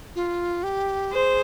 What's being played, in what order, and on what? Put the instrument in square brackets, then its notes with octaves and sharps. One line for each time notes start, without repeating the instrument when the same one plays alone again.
[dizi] F4
G4
[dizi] G#4 [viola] C5